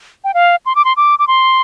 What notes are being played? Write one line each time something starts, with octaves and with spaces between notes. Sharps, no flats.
G5
F5
C6
D6
C6
D6
D6
C6